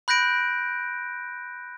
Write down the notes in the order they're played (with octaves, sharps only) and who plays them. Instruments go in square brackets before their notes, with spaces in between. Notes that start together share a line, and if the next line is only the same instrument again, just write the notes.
[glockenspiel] B5 F#6 G6 A#6 D7